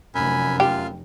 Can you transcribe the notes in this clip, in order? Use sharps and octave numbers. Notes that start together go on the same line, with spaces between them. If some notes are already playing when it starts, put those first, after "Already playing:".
F1 F#2 G#5 B5
F4 G4 F5